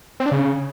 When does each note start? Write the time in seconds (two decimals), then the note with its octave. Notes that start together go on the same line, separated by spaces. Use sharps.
0.20 C4
0.26 D4
0.32 C#3